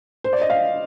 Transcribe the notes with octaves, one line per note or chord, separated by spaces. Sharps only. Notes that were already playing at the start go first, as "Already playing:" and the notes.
C5
D5
D#5
F5